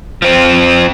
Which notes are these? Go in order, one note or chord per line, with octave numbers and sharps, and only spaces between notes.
F3 C4